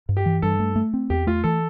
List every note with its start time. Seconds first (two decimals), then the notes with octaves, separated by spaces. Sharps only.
0.09 G2
0.17 G4
0.26 E3
0.42 G2 A4
0.59 A3
0.76 A3
0.94 C4
1.10 E2 G4
1.27 A3 F4
1.44 E3 A4